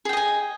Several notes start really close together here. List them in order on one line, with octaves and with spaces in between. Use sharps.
G#4 G5 D#5 G#5